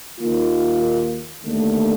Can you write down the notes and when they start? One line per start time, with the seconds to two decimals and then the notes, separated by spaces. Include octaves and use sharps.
0.19 D#2 D#3 A#3 F4
1.43 D#2 D3 A3